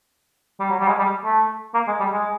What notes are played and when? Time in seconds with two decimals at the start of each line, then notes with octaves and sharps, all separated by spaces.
0.60 G3
0.70 F#3
0.80 G3
0.88 G#3
0.99 G3
1.24 A3
1.74 A#3
1.87 G#3
2.00 G3
2.13 G#3